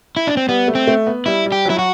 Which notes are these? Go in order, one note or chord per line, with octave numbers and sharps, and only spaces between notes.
E4
D4
C4
G3 B3
A3
C4
A3
B3
G3 E4
G3
G4
F#3 E4
F#4